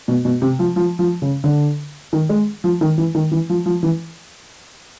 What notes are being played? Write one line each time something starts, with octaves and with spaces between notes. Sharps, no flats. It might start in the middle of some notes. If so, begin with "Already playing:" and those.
B2
B2
C3
F3
F3
F3
C#3
D3
D#3
G#3
F3
D#3
E3
D#3
E3
F3
F3
E3